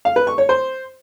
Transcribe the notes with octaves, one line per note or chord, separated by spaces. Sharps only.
F5
B4
C#6
C#5
C5